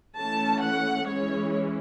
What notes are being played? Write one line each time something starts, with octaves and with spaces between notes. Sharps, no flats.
E3 A3 C#4 A5
F#5
E3 G#3 C#4 C#5